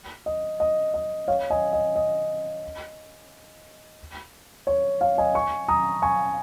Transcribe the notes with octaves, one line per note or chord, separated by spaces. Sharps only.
D#5
D#5
D#5
C#5 F5
D#5 G#5
D#5
D#5
C#5
C#5 F5
D#5 G#5
G#5 C#6
A#5 D#6
G#5 C#6